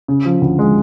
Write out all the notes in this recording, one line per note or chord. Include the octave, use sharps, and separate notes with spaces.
C#3
F3
D2
G#3